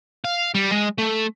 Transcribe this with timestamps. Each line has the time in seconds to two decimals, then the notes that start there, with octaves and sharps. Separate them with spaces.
0.24 F5
0.55 G3
0.71 G#3
0.98 A3